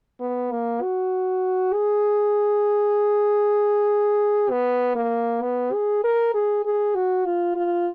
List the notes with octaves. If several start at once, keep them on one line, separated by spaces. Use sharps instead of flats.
B3
A#3
F#4
G#4
B3
A#3
B3
G#4
A#4
G#4
G#4
F#4
F4
F4